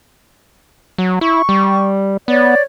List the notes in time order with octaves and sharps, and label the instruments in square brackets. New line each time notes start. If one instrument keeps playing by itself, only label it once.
[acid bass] F#3
[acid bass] E4 [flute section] C#6
[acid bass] G3
[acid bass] B3 [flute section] C#5 D5